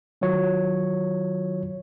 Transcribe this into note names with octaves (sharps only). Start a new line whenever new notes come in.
D#3 F#3 F4 C#5